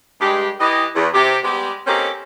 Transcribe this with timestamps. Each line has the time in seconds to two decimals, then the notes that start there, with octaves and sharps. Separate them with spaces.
0.20 G2 G#3 G4
0.60 E3 G4 D#5
0.95 E2
1.14 C3 G4
1.43 G3 G#3 B3 G4
1.87 A#3 C4 C#4 D#4 G4 A4